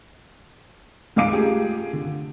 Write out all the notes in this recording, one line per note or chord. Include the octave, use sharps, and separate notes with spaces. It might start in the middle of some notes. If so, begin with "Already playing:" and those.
C#2 G#2 F5 D6 D7
A3 F4 G4 G#4
D3